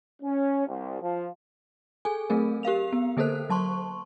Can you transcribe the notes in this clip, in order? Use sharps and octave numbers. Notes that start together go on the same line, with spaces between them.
C#4
C2
F3
G#4 A4 G#5
F#3 A3 C4 G#4 A#4
G4 A#4 F5 F7
B3
D3 A#3 A4 A#4 C5 F#6
F#3 A5 C6 C#6